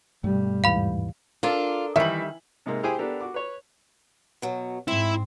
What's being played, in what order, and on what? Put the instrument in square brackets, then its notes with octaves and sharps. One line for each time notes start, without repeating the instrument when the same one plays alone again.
[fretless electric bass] G2 A3 [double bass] B2 G3
[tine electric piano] D#2 G#2 E3 [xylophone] F5 B5
[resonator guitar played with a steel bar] D4 A4 A#4 [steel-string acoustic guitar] F4
[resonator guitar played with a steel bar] D#3 G3 [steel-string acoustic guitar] E3 [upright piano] E5 F#7
[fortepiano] G#2 C3 G#3 A#3
E4 G4 G#4 C5 G5 G#5
B3 D4 G4 A4 A#4
F#4 D6
B4 C#5
[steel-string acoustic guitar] B2 F#3
[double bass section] G#2 [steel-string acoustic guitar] C4 [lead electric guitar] E4